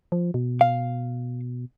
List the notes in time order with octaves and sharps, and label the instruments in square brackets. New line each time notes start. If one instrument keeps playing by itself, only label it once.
[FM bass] F3
B2
[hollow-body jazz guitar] F5